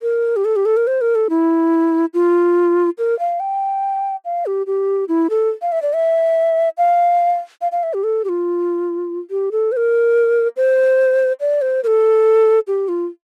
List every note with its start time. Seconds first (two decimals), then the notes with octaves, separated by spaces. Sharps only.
0.02 A#4
0.36 G4
0.45 A4
0.56 G4
0.65 A4
0.77 A#4
0.87 C5
1.01 A#4
1.15 A4
1.30 E4
2.14 F4
2.98 A#4
3.19 F5
3.40 G5
4.25 F5
4.46 G4
4.67 G4
5.08 E4
5.30 A4
5.62 F5
5.72 E5
5.82 D5
5.93 E5
6.78 F5
7.61 F5
7.72 F5
7.83 E5
7.94 G4
8.04 A4
8.25 G4
8.29 F4
9.31 G4
9.52 A4
9.72 C5
9.77 A#4
10.57 C5
11.41 D5
11.62 C5
11.84 A#4
11.87 A4
12.67 G4
12.88 F4